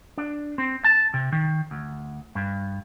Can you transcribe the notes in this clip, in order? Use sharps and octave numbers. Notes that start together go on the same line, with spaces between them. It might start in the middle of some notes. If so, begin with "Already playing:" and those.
D4
C4
A5
C3
D#3
D2
G2